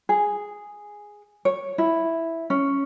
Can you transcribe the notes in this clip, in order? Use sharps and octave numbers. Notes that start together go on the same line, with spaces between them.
G#4
C#5
E4
C#4